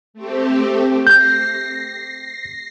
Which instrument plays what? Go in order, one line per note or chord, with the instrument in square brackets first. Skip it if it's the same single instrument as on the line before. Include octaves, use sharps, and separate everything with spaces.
[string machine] A3 C4 G4
[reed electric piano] G6 [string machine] A#6 C7